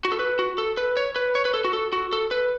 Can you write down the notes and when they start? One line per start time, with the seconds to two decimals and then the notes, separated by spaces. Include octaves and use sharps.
0.05 F#4
0.12 A4
0.19 B4
0.39 F#4
0.58 A4
0.77 B4
0.97 C#5
1.16 B4
1.35 C#5
1.45 B4
1.54 A4
1.65 F#4
1.73 A4
1.93 F#4
2.13 A4
2.31 B4